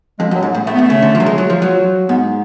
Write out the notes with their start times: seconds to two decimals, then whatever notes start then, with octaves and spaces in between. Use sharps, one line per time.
0.19 F2 G#3
0.31 F#2 F#3
0.42 G#2
0.54 A2
0.66 A2 A3
0.74 B3
0.78 B2 A3
0.90 C#3
1.02 D3
1.15 F3
1.20 F#3
1.26 G#3
1.38 F#3
1.50 F3
1.62 F#3
2.09 G#2 B3